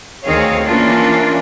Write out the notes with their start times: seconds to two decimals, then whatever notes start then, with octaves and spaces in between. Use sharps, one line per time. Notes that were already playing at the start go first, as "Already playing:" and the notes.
0.24 D2 D#3 C4 G#4 C#5 F5
0.65 E3 A#3 C#4 D4 F4